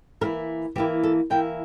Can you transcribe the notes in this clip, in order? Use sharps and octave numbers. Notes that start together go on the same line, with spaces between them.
E3 A#3 E4 A#4
E3 A#3 E4 G4
A4
E3 A#3 E4 G5